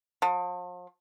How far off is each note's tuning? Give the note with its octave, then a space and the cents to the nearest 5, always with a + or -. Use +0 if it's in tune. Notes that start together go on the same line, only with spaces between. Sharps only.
F3 +40